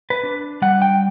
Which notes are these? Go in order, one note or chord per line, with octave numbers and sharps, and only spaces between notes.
B4
D4
G3 F#5
G5